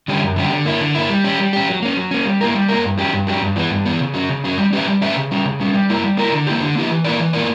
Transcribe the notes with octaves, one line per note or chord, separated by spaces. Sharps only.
D3 G3 C#4 G4
F#2
D3 G3 C#4 G4
D3
A#3 E4
D3
A#3 E4
G3
C#4 G4
G3
C#4 G4
F#3
A#3 C#4
F#3
A#3 C#4
G3
A#3 E4 A#4
G3
A#3 E4 A#4
G2
F#3 C#4 G4
G2
F#3 C#4 G4
G2
E3 B3
G2
E3 B3
C#3
F#3 C#4
C#3
F#3 C#4
G3
C#4 G4 B4 E5
G3
C#4 G4 B4 E5
C#3
G3 C#4
C#3
G3 C#4
G3
A#3 E4 A#4
G3
A#3 E4 A#4
D3
A#3 E4 G4
D3
A#3 E4 G4
E3
A#3 E4 A#4 D5
E3
A#3 E4 A#4 D5